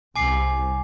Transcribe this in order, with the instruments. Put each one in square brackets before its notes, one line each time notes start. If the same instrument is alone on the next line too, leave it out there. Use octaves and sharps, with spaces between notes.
[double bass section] C2 [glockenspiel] G#5 D6 C7